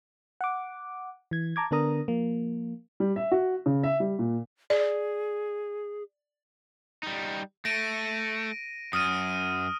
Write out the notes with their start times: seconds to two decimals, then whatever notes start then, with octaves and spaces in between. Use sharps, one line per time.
0.41 F#5 D6
1.31 E3 G#6
1.56 A5 A#5 D6 G#6
1.71 D3 B3 D4 A#4 A#5 D#6
2.08 F3 A#3
3.00 G3
3.16 E5
3.32 F#4
3.66 C#3
3.83 E5
4.00 G3
4.19 A#2
4.70 G#4 D5
7.03 G3 D#4
7.65 A3 A#6 D7 D#7
8.93 F#2 D#6 F6 D#7